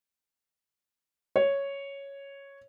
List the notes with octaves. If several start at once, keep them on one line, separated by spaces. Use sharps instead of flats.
C#5